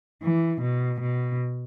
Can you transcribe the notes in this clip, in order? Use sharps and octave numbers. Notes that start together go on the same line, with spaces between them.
E3
B2
B2